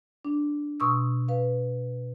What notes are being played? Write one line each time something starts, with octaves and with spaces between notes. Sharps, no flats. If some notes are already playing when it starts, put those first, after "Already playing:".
D4
B2 C6 C#6 D#6 E6
B4 F5